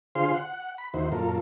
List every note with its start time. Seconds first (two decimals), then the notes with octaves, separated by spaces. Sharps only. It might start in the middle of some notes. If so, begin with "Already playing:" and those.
0.15 D3 F4 G#4 C5 F5 C6
0.34 F#5
0.78 B5
0.94 D#2 D#3 E4 F#4 C5
1.12 F#2 A#2 F4 A4 A#4